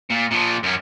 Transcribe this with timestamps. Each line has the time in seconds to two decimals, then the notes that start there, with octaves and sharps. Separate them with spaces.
0.10 A#2
0.31 A#2 F3
0.63 F#2 C#4